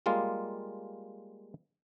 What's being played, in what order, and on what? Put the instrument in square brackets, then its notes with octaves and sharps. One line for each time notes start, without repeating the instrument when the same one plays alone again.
[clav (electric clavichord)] G3 G#3 A#3 F4